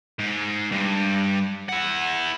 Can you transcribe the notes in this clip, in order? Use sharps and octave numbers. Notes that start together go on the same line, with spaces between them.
G#2
G2
E4 F#5